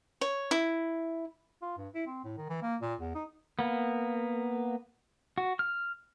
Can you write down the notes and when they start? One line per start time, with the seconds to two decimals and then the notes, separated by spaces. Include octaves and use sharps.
0.21 C#5
0.51 E4
1.62 F4
1.77 G2
1.95 E4
2.07 C4
2.24 A2
2.37 D#3
2.50 E3
2.62 A#3
2.82 A#2
3.00 E2
3.15 D#4
3.59 A#3 B3
5.38 F#4
5.59 F6